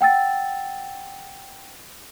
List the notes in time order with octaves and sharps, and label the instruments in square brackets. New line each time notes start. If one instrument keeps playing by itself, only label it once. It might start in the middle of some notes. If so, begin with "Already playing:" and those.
[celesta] F#5 G5 E6 A6